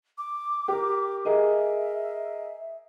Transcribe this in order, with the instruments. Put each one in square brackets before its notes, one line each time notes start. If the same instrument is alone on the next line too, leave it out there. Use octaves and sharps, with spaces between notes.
[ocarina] D6
[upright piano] G4 A#4
[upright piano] G#4 A#4 D#5 [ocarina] E5